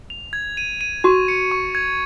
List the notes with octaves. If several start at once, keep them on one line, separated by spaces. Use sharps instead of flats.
F7
G#6
D#7
D#7
F#4 C#6
C#7
C#6
G#6